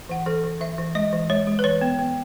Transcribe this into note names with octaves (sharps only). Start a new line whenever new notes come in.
E3 F#5
E3 A4
E3
E3 E5
E3
G#3 D#5
E3
G#3 C#5
G#3
B4
E3 C#5
B3
B3